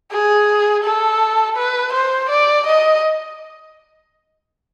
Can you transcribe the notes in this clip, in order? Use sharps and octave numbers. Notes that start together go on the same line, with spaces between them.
G#4
A4
B4
C5
D5
D#5